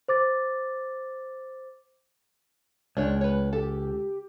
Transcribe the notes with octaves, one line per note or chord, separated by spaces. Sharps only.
C5 D6 A6
C#2 G#3 D4 C#5
B4 C#5
G4 A4